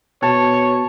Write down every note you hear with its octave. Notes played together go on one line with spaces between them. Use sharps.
B2 C#5 A5